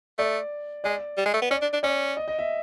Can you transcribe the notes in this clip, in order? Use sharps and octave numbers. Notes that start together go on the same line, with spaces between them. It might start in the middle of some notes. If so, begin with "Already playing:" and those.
A3 D5
G#3 D5
G3
G#3
A3
B3
C#4 D5
D4
D4
C#4 D5
D#5
D#5
E5